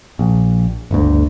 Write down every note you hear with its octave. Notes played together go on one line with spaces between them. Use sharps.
A#1
G1 D2